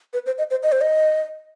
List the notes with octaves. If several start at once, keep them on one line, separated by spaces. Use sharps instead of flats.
B4
C5
D#5
C5
D#5
C5
D#5